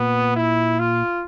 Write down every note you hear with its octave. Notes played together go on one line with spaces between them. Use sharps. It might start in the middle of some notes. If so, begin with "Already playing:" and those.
Already playing: A#2 B3
E4
F4